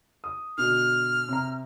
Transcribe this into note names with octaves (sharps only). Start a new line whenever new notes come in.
D#6
B2 D3 F6
C3 A#5